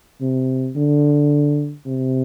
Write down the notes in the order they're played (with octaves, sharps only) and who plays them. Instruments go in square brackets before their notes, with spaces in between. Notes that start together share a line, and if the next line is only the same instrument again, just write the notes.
[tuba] C3
D3
C3